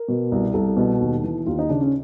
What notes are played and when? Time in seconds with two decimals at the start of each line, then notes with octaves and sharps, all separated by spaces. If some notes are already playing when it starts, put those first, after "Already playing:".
Already playing: A#4
0.08 B2
0.32 C2
0.54 C2 A4
0.77 B2
1.01 D#2
1.24 E3
1.46 D#2 F4
1.59 D#4
1.69 C#3 D4
1.81 C#4